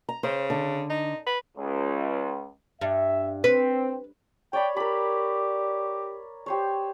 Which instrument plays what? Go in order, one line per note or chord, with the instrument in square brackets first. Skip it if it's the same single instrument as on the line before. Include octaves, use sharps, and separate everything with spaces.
[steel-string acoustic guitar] A#5
[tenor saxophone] C#3 [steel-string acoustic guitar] C5
[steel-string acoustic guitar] D3
[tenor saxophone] D#4
B4
[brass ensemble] C#2
[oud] G2 [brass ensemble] E5
[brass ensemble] C4 [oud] B4
[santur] C#5 D5 B5 [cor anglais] G5
[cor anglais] G4 [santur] A#4 B5
[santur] G4 C5 C#5